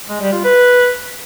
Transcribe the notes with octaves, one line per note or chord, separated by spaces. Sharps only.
G#3
G3
F4
B4